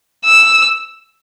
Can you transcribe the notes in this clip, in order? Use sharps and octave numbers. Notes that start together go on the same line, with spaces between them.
E6